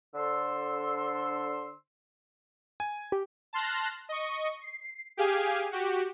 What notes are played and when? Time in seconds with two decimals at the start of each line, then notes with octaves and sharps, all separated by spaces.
0.15 D3 D4 A4 C5 C6 E6
2.80 G#5
3.12 G4
3.53 A5 C6 F6 F#6 A#6
4.09 D#5 C#6
4.62 C7
5.17 G4 G#4 F5 G#5
5.72 F#4 G4